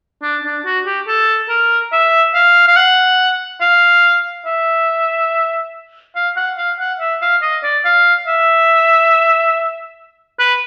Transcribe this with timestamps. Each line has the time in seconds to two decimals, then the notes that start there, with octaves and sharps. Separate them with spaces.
0.22 D4
0.44 D4
0.65 F#4
0.86 G4
1.07 A4
1.49 A#4
1.92 E5
2.34 F5
2.68 F5
2.77 F#5
3.61 F5
4.46 E5
6.15 F5
6.37 F#5
6.58 F5
6.79 F#5
7.00 E5
7.22 F5
7.42 D#5
7.63 D5
7.85 F5
8.27 E5
10.39 B4